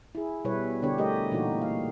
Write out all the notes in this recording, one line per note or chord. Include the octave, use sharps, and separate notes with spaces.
E4 G#4
B2 G3 E4 B4 C#5
D3 B3 D4 G4 C#5
G3 A3 G4 A#4 D#5
A#2 E3 A#3 D#4 F#4
F5